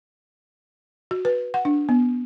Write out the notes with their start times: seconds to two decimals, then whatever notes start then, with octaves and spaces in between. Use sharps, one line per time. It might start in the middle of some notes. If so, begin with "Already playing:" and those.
1.11 F#4
1.25 B4
1.54 F#5
1.65 D4
1.89 B3